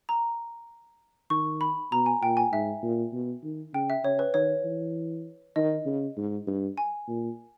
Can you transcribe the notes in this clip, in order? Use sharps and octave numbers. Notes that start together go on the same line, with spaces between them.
A#5
D#3 C#6
B5
B2 A#5
G#5
A#2 G5
G#5
G#2 E5
A#2
B2
D#3
C#3 G5
E5
C#3 C#5
B4
D#3 C#5
E3
D#3 D#5
C#3
G#2
G2
G#5
A#2